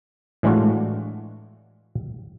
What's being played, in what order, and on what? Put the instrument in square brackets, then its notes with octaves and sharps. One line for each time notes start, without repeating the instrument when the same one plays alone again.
[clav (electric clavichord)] A2 E3 G#3 D4 F4 F#4